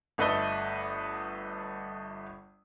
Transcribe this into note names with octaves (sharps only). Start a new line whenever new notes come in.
G1 A3 A4 B4 D#5 G7